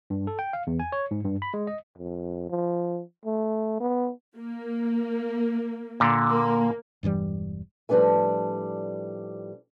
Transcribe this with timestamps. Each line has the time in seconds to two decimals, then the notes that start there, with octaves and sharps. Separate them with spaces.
0.10 G2
0.27 A4
0.39 G5
0.53 F5
0.67 E2
0.80 G#5
0.92 C#5
1.11 G#2
1.25 G2
1.42 B5
1.54 G#3
1.67 D#5
1.98 F2
2.49 F3
3.25 A3
3.80 B3
4.37 A#3
6.00 A#2 D3
6.31 A#3
7.03 E1 G2 E3 G3
7.89 A2 F3 G3 D4 B4 G#5